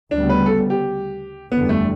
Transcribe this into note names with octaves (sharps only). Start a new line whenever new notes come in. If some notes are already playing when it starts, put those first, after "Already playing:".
D2 C#3 G3 B3 D4
B4
A4
G4
F#1 E2 D3 G3 B3
A3